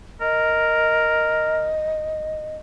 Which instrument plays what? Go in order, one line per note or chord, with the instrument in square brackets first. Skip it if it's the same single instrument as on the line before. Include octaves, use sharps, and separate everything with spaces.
[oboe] A#4 [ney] D#5